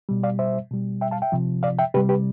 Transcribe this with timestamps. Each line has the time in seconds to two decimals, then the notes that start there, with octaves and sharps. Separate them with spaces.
0.09 B2 G3
0.23 D5 F5
0.39 C5 E5
0.71 B2 G3
1.01 E5 G5
1.11 F5 A5
1.22 E5 G5
1.32 C3 F3
1.63 D5 F5
1.79 E5 G5
1.94 C3 G3 G4 B4
2.09 G4 B4